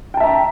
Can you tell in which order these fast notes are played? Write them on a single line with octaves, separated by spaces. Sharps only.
G5 A5 E5 A#5